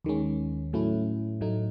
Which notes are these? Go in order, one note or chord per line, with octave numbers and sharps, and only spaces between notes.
D#2 D#3 G#3 C#4
A2 F#3 A3 C#4 E4
A2 F#3 A3 D#4